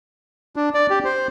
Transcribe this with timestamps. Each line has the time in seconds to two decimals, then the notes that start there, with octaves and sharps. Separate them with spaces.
0.56 D4
0.74 D5
0.90 G4
1.05 C5